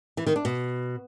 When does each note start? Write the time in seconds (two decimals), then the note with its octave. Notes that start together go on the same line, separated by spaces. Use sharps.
0.17 E3
0.26 D#3
0.36 D4
0.45 B2